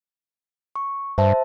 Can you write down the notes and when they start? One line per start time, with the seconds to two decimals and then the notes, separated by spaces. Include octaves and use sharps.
0.76 C#6
1.18 G2 C5 E5 A5